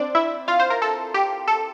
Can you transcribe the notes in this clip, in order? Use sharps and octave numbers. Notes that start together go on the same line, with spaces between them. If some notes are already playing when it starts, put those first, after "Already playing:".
Already playing: C4 D4 C5 D5
E4 E5
F4 F5
C5
A#4
A4
G4
A4